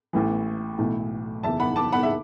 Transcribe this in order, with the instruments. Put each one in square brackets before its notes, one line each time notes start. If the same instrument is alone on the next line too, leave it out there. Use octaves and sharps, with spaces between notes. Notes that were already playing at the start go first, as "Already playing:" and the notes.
[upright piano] A1 A2 E3
B1 A2 E3
F#1 E2 E3 E5 A5
F#5 B5
A5 D6
F#5 B5
E5